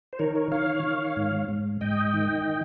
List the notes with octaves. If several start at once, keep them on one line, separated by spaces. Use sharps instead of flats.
C5
D#3 A#4 C#5
A#4 C#5
D#3 C#5 F5
D#3
G#2
G#2
G#2 D#5 G5
D#3